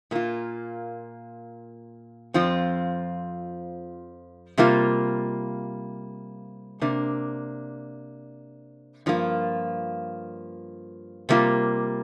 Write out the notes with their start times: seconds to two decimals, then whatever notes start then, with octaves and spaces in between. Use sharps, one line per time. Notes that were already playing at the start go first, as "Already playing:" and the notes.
0.11 A#2 A#3 F4
2.34 F2 F3 C4 F4
4.58 C3 G3 A#3 F4
6.81 C3 A#3 D4
9.06 G2 F3 A#3 F4
11.29 C3 G3 A#3 F4